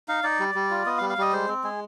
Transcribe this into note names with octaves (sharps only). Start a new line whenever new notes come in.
D#4 F5
D#4 D5
G3
G3
F4
B3 D#5
F5
G3
F5
G3 D#5
G#3 C5
C4
G#3 G#4